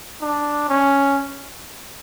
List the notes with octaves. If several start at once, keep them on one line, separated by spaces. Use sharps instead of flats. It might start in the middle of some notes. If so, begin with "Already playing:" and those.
D4
C#4